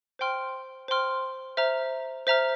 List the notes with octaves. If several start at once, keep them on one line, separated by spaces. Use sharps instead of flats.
C5 G5 C6 F6
C5 G5 C6 F6
C5 E5 A#5 F6
C5 E5 A#5 F6